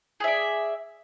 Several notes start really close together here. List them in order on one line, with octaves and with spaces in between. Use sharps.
G#4 E5 D5